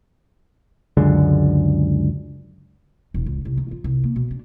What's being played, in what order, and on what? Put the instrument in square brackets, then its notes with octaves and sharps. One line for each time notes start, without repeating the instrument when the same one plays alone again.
[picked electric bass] C#2 F#2 D3 G#3
[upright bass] E1
C#2
C2
D#3
F4
C2
A#3
B2
D4